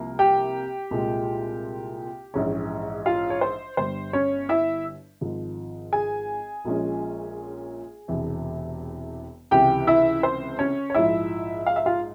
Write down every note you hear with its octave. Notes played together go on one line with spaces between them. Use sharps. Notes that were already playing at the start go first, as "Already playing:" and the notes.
Already playing: C2 C3 F3 A#3
G4 G5
C2 A#2 G#3
A#1 G#2 E3 G#3 C#4
F4 F5
C#5
C5
G1 G2 G3 C5
C#4 C#5
E4 E5
G#1 G#2 F3
G#4 G#5
A#1 A#2 F3 G#3 C#4
E1 E2 C3
C#2 C3 E3 G4 G5
E4 E5
C5
C#4 C#5
C#5
A#1 G#2 F3 E4 E5
F5
E5
F4 F5